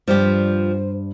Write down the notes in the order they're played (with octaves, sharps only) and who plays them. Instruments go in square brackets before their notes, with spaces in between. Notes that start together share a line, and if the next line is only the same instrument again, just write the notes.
[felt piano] G2 [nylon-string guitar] F3 G3 G4 [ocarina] C5